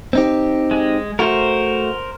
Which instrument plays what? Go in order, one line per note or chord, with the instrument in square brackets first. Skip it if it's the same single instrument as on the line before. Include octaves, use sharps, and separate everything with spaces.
[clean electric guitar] C4 D#4 G4
[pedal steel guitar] G#3
[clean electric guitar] A3 F#4 [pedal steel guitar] A#4 C5